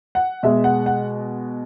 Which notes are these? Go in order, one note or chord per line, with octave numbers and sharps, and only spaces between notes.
F#5
B2 G#3 E5
F#5
F#5